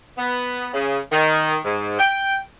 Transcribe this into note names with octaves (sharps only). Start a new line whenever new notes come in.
B3
C#3
D#3
G#2
G5